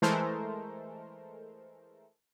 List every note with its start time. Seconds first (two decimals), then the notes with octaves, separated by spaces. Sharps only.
0.02 E3 G#3 A3 A4 A#4 C5